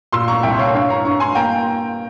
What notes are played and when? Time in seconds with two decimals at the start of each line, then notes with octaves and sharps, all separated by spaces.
0.12 A#2 C6 E6
0.28 A#5 C#6
0.43 C2 E5 G5
0.59 C#5 F5
0.74 G2 C#5 F5
0.90 A#5 C#6
1.05 G2 A#5 C#6
1.20 G#5 C6
1.35 A#3 G5 A#5